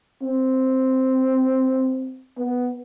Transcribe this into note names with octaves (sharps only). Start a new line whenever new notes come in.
C4
B3